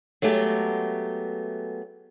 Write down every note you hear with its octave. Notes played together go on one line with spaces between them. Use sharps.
F#3 G#3 A3 B3 G4